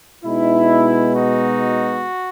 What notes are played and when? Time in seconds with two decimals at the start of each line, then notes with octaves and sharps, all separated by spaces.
0.24 B2 G#3 B3 D#4 E4
1.16 D#4 F#4